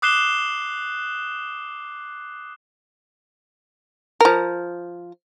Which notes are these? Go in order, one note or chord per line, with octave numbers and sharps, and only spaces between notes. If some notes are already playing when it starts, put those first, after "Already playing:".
D6 D#6 F#6 C7 E7 G7
F3 A#4